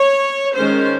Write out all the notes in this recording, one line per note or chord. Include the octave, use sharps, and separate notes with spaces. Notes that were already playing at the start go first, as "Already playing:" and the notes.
Already playing: C#5
D#3 G#3 C#4 C5